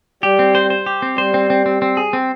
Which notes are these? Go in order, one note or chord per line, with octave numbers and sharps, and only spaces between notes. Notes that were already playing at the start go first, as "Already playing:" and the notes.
G3 G4
C4
C5
C5
G4
C4
G3 C5
C4
C4
C4
C4
G#4
C4